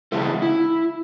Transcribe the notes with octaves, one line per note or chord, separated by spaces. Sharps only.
C#3 E3 G#3 E4 A4
E4